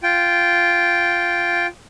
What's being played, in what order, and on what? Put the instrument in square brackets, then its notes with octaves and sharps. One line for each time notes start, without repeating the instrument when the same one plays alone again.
[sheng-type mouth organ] F4 G5